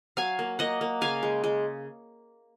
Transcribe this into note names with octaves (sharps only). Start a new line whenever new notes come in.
F#3 F5 G#5
A#3
A#3 D#5 F#5
A#3
C#3 F5 G#5
G#3
G#3